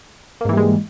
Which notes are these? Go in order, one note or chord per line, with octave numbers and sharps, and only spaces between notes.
G#2 E3 G3 G#3 A#3